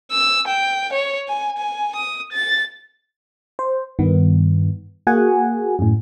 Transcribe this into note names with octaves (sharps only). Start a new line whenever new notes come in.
E6
G5
C#5
G#5
G#5
D#6
A6
C5
G2 D#3 B3
A#3 F#4 G#4 F#5 G#5
F#2 A2